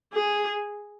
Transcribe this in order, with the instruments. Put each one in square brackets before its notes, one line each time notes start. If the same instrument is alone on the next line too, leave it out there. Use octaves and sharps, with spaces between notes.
[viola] G#4